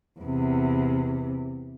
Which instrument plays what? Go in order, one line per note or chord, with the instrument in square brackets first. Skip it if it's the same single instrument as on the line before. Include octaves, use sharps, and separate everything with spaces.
[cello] E2 C3